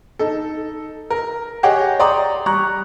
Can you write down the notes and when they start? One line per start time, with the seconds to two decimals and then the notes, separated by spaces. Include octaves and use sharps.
0.19 D#4 A4
1.10 A#4
1.63 G4 G#4 C#5 D#5 F#5 G5
2.00 D5 G5 A#5 C6 D#6
2.46 G3 A#5 C#6 F#6